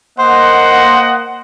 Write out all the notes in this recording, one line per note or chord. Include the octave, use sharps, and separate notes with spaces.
A#3 C5 D#5 F#5